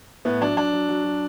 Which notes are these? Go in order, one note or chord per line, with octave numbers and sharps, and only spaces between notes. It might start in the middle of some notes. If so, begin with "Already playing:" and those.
A2 B3
F#3 D4
F#3 D4
F#3
F#3
F#3